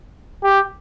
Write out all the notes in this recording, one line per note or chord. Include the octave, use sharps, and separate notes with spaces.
G4